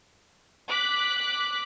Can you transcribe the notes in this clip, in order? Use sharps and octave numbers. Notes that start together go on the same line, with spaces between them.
D6 F#6 B6